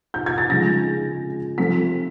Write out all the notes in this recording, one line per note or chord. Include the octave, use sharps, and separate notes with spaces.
G6
G#6
A6
C#3 F3 G#3 A#6
C3 F3 A3 C4 B6